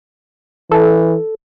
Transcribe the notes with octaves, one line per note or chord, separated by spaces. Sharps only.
E3 A4